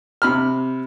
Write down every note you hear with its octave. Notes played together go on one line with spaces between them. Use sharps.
C3 B5 F6